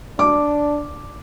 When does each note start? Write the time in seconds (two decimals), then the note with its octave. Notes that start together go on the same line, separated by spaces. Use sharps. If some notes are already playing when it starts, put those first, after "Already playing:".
0.19 D4 D6